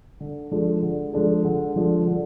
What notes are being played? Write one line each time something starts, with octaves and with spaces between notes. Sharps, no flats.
D3
F3 G#3 D4 A4
D3
F3 G#3 D4 A4
D3
F3 G#3 D4 A4
D3